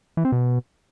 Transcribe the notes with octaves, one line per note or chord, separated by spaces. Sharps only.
E3
C4
B2